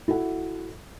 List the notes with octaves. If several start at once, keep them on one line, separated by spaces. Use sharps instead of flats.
E4 F#4 A4 F#5